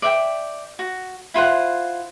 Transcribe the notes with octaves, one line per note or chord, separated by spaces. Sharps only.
D5 E5 F#5 G5
F#4
E4 F4 C5 F#5